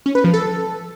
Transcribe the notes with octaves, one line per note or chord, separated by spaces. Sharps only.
C#4
B4
F3
A4